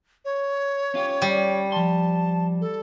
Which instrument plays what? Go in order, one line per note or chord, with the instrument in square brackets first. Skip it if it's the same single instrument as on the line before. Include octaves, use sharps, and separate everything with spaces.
[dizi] C#5
[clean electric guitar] C#4 F4 G4
[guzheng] G3
[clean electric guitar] F3 C6 [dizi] A5
[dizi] A4